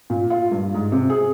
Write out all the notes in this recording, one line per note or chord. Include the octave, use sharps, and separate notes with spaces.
A#2
F4
G2
G#2
C3
G#4